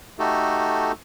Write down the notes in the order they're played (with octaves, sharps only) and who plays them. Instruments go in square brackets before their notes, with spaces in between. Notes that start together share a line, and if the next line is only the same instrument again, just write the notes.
[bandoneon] A3 D#4 F#4 G4 A4